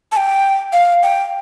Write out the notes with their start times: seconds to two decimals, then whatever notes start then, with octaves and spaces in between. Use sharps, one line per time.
0.12 A5
0.17 G5
0.73 F5
1.03 G5